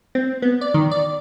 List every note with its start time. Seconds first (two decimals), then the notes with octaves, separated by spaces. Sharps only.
0.15 C4
0.42 B3
0.61 D5
0.74 D#3
0.91 D5